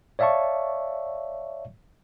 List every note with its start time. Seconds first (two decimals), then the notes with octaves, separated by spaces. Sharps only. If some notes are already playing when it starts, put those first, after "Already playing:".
0.19 C#5 D5 E5 F5 A5 C#6